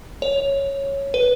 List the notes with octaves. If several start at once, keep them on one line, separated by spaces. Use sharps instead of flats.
C#5
B4